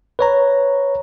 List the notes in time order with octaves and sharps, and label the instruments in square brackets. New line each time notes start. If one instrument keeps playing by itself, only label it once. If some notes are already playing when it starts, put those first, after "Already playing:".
[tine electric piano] B4 C#5 A#5